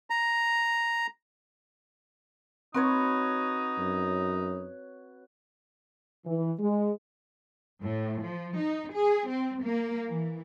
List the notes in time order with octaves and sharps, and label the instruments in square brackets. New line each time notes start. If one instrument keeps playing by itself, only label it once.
[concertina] A#5
[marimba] C4 [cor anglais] D#4 [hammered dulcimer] F#4 B4 C#5
[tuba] F#2
[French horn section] E3
G#3
[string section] A2
F3
D#4
G#4
C4
A#3
E3